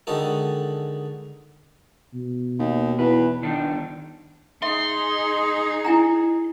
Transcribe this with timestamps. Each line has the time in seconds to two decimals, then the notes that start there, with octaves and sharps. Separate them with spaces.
0.07 D3 D#3 G#3 F#4 A4
2.14 B2
2.59 D#2
2.99 E2 B4
3.43 G1 D#3 D4 D#4
4.62 D#4 G#4 E5 C6
5.85 E4 G#5 A#5